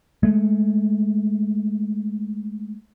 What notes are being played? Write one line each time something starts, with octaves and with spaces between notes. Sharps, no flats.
G#3 A3